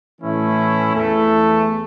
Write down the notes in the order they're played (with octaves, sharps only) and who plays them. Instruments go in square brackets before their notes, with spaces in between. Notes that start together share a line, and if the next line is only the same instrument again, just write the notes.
[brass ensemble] A2 E3 A3 C#4 E4
E2 E3 A3